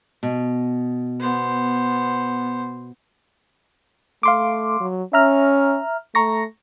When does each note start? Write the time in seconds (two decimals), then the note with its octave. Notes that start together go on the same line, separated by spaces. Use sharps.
0.23 B2
1.20 B3 C5
4.23 A3 F5 C6 D6
4.80 F#3
5.13 C#4 E5 A#5 F6
6.15 A3 A#5 C#6 A#6